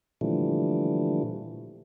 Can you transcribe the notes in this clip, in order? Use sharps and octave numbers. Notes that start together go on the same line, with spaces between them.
A#2 D3 E3 F3 G3 A3